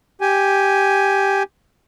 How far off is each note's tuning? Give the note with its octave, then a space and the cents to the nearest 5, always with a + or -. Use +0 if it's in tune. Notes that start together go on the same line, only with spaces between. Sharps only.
G4 +0 G#5 +0